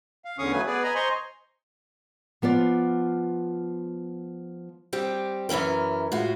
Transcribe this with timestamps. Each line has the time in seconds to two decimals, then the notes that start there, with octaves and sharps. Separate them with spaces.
0.25 F5
0.39 E2 D3 C#4 F5 C#6 D#6
0.52 F#3 A3 B4 G#5
0.67 B3 G#4 B4 D5
0.83 D#5 G#5 A#5 B5
0.95 C5 D#5 G#5 A#5 C6 C#6
2.42 F3 B3 F4 D5
4.93 G3 C4 G4
5.49 F#2 E3 G#3 C#4 A#4
6.12 A2 G#3 F4 F#4